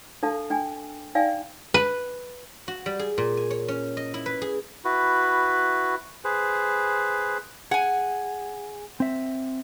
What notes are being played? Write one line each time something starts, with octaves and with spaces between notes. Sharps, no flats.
D4 A4 F5 A5
D4 G5 G#5
D#4 D5 F5 G5 G#5
B4
F#4
G3
G#4
A#2
G#5
C#5
C#4
D#5
E4
B4
G#4
E4 F#4 B4
G#4 B4 C5
G#4 F#5 G#5
C4 E5